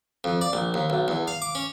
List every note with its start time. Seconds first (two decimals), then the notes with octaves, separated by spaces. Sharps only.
0.24 F2
0.41 D5
0.53 A#1
0.74 D#2
0.90 B1
1.08 E2
1.28 F5
1.42 D6
1.55 C#4